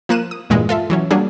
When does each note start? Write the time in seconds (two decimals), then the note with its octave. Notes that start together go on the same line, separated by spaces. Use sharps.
0.09 F3 A#3 F#6 D#7 E7
0.31 D#6
0.50 E2 G2 A#2 E3 G#3
0.69 F4 A4 E5
0.90 E3 F#3 C#4
1.11 F#3 G3 A#3 D4 G#4